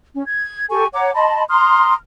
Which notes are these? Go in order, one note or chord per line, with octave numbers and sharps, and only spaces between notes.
C#4
G#6
G4 A4 G#5 C#6
C#5 F#5 A#5 D6
D#5 A5 B5 C6
A#5 C6 D#6 F6